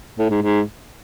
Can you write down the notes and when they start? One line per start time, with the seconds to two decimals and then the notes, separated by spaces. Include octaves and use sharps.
0.18 A2
0.30 G#2
0.42 G#2